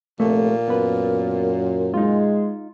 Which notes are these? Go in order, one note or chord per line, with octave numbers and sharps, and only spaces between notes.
F1 A#2 A3
F#2 B3 B4
G#3 D#4 F4